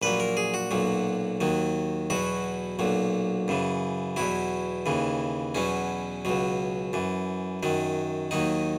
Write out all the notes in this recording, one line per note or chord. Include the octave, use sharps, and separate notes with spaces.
A#1 A#2 F#3 B4
A#4
G#4
F#4
B1 A#2 F#3
D#2 D#3 F#3
E2 B2 F#3 F#4
B1 A#2 F#3
F#2 C#3 E3
E2 B2 F#3 E4
D#2 C#3 E3
E2 B2 F#3 C#4
C#2 B2 F#3
F#2 E3
F#2 D#3 F#3
D#2 D#3 F#3 D#4